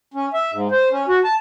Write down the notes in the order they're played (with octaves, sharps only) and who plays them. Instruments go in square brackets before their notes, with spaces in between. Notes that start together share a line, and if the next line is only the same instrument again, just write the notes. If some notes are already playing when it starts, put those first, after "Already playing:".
[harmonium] C#4
E5
G#2
C5
C#4
F#4
A5